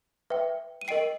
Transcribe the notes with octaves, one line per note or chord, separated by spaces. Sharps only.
B4 E5 G5
D#7
A#4 D#5 G5 C7 D7